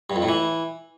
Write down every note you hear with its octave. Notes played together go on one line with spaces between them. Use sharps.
G2
F2
A2
E3